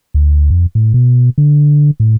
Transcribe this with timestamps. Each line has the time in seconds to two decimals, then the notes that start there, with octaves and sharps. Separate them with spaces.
0.14 D2
0.50 F2
0.75 A2
0.94 B2
1.38 D3
2.00 A2